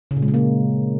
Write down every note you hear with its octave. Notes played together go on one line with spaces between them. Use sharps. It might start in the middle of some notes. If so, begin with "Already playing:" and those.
C#3
A#2
G#3
C#3
A#3